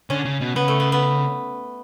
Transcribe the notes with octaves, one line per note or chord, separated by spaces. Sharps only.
D3 C#4
C#3
B2
C#3 B3
A3
B3
B3